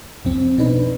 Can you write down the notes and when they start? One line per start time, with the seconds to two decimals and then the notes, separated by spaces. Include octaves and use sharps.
0.25 C2 F2 F3 C4
0.58 B2 D4 D#4 B4